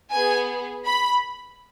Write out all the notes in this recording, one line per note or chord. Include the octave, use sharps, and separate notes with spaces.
B3 G#4 G#5
B5